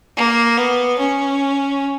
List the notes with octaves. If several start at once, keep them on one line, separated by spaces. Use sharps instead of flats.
A#3
B3
C#4